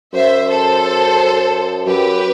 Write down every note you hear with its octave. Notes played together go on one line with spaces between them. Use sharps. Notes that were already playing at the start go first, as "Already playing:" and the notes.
F#2 C5 E5
A4 C5
F#2 G4 B4